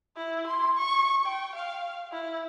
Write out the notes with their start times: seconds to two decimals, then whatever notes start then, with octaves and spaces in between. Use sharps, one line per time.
0.17 E4
0.47 C6
0.78 C#6
1.27 G5
1.56 F5
2.12 E4